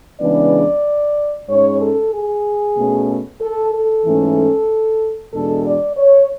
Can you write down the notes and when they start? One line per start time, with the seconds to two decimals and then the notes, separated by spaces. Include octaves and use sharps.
0.21 C#3 E3 G#3 B3 D4 D5
1.49 G#2 G#3 C#4 C#5
1.81 A4
2.13 G#4
2.77 B2 A3 C#4
3.41 A4
3.73 A4
4.05 G#2 E3 A3 C#4
5.33 E2 B2 G#3 D4 A4
5.65 D5
5.97 C#5